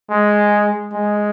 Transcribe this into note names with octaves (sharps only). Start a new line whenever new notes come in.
G#3
G#3